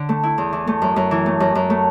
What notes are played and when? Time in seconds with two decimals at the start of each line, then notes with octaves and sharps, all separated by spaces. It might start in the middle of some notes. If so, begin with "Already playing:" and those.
Already playing: D3
0.09 A3
0.23 E4
0.38 E2
0.53 E3
0.67 A3
0.82 F#2
0.96 F#2
1.11 E3
1.26 A3
1.40 F#2
1.55 F#2
1.70 A3